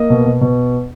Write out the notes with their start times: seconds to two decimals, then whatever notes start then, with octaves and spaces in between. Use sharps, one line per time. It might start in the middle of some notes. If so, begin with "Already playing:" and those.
Already playing: A#3 D#5
0.10 B2
0.25 B2
0.41 B2